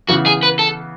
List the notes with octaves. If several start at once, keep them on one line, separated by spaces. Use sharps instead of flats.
C#3 E3 B3 F#4
G#4
B4
A4